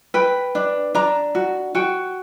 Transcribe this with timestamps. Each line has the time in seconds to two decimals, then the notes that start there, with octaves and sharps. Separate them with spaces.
0.14 B4 G5
0.55 D4
0.95 D4 A#5
1.35 F#4
1.75 F#4 G5